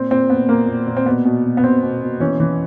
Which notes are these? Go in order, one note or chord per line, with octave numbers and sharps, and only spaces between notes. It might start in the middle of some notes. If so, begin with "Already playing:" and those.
Already playing: A#2 C4
A#2 C4
A#2 B3
A#2 A#3
A#2
A#2
C4
B2 B3
B2
B2
B3
B2 C4
B2
B2
E3 C#4
E3